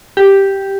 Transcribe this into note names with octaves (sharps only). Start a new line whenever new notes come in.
G4